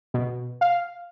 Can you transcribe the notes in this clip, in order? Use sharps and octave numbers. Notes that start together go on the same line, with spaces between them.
B2
F5